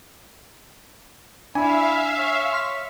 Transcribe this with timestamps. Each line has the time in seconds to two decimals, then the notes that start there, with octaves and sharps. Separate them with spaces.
1.55 D4 E4 E5 F5 G#5
2.18 C#5
2.53 C6 F6 B6